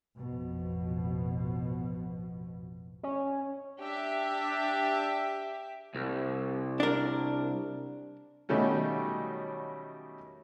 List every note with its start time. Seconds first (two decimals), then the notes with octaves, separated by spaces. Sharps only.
0.17 A1 F2 B2 F3
3.03 C#4
3.80 D4 G4 E5
5.95 C2
6.80 D4 A#4
8.49 B2 D#3 F#3 G3 A3 C#4